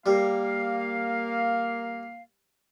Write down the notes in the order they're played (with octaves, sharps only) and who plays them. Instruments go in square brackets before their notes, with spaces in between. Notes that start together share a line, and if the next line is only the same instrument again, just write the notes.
[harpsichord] G3 [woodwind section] A#3 F5